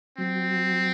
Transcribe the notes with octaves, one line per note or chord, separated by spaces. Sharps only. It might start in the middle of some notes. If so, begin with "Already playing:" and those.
F#3 C4